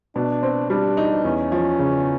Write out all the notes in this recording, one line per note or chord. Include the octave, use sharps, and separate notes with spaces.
B2 D4
C4
G3 D4
D#4
E2 C#4
F3
C#3